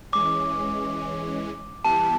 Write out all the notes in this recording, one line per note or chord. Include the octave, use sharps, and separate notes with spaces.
E3 G#3 C#4 D6
E3 G3 B3 E4 G4 A5